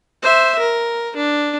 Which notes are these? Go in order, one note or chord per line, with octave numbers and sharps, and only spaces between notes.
C5 E5
A#4
D4